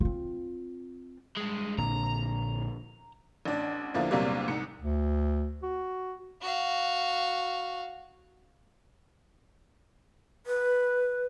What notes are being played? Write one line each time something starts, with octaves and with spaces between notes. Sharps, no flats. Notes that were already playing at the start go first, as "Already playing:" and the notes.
C4 F4
G2 G#3
A#1 A#2 D3 A#5
A1 D4
E2 D3 F3 A#3 E4
A#1 E2 C3 F#3 G3 A#3
C2 G#2 C#7
D2
F#4
F#4 F5
B4